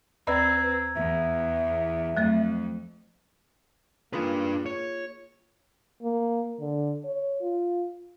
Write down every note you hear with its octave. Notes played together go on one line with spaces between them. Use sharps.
D#2 C4 B4 D5 A#5 B5 E6 G#6
E2 E5
F2 F#3 A3 A6
A#3 D4 D#4 F4 G#4 B4
C#5
A#3
D3
C#5
F4